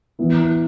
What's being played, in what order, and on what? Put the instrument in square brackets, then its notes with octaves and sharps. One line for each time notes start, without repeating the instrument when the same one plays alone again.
[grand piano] E3 B3 E4